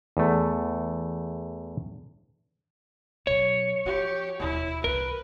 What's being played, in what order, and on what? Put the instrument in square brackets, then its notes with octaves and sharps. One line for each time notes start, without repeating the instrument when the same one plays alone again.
[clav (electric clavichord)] E2 A3
[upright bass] B2 F#3 [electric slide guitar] C#5
[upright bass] F3 [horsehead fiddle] G4
[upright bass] E1 D#2 [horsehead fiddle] E4
[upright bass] C2 E3 [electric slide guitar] A#4 [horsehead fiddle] B4